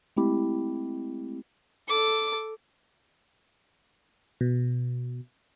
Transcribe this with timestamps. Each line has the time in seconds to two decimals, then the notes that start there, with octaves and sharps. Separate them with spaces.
0.17 G#3 A3 C4 E4 G4
1.89 A4 D6
4.41 B2